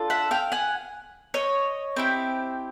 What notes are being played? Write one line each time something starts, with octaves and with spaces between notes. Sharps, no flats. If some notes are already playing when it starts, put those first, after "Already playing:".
Already playing: D4 F4 A4
E5 F#5
F5 G5
F#5 G#5
C#5 D#5
C4 E4 G4